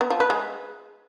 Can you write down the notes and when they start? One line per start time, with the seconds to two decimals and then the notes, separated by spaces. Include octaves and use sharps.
0.01 B3
0.10 F3
0.20 B4
0.30 G#3